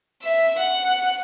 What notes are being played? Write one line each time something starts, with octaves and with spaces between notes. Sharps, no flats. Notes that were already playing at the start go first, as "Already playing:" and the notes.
E5
F#5